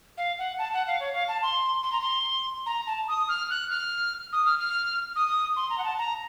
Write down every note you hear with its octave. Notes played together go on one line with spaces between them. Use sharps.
F5
F#5
A5
F#5
F5
C#5
F5
A5
C6
C6
A#5
C6
A#5
A5
D#6
F6
F#6
F6
D#6
F6
F6
D#6
C6
A#5
F#5
A5
A#5